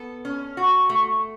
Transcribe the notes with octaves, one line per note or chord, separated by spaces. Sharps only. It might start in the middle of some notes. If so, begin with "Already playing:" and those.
Already playing: B3 A4
C#4
F#4
A3